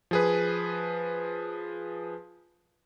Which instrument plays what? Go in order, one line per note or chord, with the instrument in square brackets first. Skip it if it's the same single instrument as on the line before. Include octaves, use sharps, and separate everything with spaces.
[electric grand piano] F3 G#4 B4